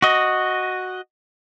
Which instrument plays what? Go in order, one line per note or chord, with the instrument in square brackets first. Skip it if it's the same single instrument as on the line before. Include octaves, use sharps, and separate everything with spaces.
[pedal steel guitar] F#4 D#5